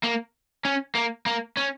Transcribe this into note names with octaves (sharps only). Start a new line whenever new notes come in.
A#3
C#4
A#3
A#3
C#4